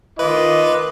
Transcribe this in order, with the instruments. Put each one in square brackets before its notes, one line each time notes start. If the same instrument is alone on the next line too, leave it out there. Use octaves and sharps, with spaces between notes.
[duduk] D#3 [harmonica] F4 D6 [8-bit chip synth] B4 [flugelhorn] D#5